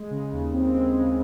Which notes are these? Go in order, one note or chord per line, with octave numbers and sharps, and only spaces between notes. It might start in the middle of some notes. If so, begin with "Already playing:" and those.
Already playing: G#3
C#3
D#2
C4
G#3
C#3